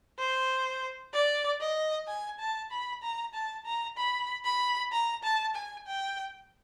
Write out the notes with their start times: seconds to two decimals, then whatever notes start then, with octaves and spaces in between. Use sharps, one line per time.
0.19 C5
1.14 D5
1.61 D#5
2.08 G#5
2.40 A5
2.71 B5
3.03 A#5
3.34 A5
3.65 A#5
3.97 B5
4.45 B5
4.92 A#5
5.23 A5
5.55 G#5
5.87 G5